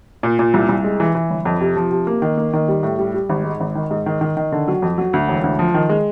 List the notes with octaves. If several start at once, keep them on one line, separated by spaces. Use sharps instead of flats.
A#2
A#2
C2
C2
G#3
E3
E3
G1
F2
C3
F3
C3
A#3
D#3
A#3
D#3
G3
A2
G3
G3
G#1
G#2
G#1
D#3
G#2
D#3
D#3
D#3
D3
F#3
F2
F#3
D2
E1
D2
F3
D#3
G#3